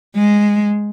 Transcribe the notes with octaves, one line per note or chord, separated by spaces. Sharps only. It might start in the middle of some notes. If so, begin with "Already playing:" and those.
G#3